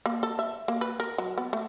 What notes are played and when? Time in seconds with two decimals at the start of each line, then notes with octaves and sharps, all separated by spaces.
0.06 A#3
0.23 A4
0.39 E5
0.68 A#3
0.81 B4
1.00 A#4
1.18 F#3
1.38 B3
1.53 A3